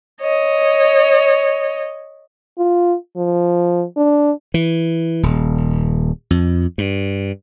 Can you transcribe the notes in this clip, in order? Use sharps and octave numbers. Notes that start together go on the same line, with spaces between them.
C#5 D#5
F4
F3
D4
E3
D#1
F2
G2